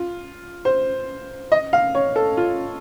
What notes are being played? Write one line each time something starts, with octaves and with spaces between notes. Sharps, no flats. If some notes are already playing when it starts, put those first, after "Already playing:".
Already playing: F4
C5
D#5
F5
C#5
A4
F4